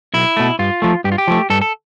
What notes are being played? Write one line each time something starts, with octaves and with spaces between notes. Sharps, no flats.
B1 E4
B2 A3
G2 F4
F3 A3
G2 G4
F4
G4
F3 A3
G2 A4
A4